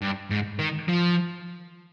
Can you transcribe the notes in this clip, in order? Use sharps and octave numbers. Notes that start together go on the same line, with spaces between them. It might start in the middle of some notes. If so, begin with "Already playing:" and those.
G2
G#2
D#3
F3